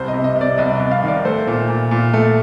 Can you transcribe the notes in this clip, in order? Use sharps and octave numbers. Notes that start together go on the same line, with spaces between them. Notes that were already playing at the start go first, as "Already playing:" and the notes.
Already playing: C2 C5
D#5
C3
D#5
C3
D5
C2 D#5
C2 D#5
F5
D#3
D5
A3 C5
A#2
A#2
A#2
A3